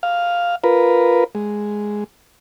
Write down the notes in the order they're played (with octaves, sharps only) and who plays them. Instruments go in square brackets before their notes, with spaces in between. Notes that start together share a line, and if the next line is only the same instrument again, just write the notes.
[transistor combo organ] F5
F4 A#4 B4
G#3